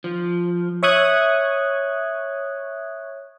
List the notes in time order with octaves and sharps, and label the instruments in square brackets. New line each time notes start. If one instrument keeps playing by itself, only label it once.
[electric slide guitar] F3
[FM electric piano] C#5 E5 C#6 D#6 F#6 G#6